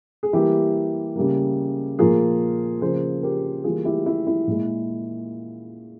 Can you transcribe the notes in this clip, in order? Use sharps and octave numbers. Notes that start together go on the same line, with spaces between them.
G#4
E3 G3 A#3 E4 G4
C#3 G3 A#3
A#2 F3 A#3 F4 G#4
C#3 F3 A#3 G#4 C5
G4 A#4
E3 G3 A#3 F4 G#4
E4 G4
E4
E4
A#2 G#3